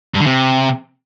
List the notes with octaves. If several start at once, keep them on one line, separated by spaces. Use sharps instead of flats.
G2
D3
C3